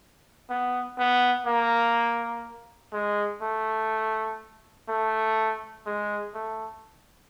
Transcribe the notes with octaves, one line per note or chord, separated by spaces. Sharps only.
B3
B3
A#3
G#3
A3
A3
G#3
A3